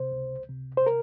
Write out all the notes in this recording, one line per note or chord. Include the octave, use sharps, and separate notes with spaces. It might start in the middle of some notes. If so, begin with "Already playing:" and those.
Already playing: C3 C5
C#2
C3
C5
A#4